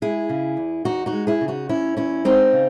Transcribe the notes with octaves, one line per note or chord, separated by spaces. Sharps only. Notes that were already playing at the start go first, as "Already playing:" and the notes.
G#3 E4 G#4
C#3
E2
E2 D#4 F#4
D#4 F#4
G#3
E4 G#4
C#3
D#4 F#4
E2 C#4 E4
E2 C#4 E4
G#3 C4 D#4
C#3